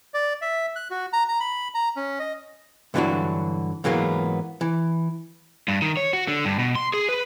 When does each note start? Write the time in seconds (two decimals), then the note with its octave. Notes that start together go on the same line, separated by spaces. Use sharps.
0.14 D5
0.42 E5
0.76 F#6
0.91 F#4
1.13 A#5
1.29 A#5
1.40 B5
1.74 A#5
1.96 C#4
2.19 D#5
2.94 G2 D3 E3 F#3 D4 F#4
3.84 G#2 E3 F#3 A#3 B3
4.61 E3
5.68 G2
5.82 D#3
5.97 C#5
6.13 F#4
6.28 D3
6.45 G2
6.59 B2
6.75 C6
6.94 G#4
7.09 B4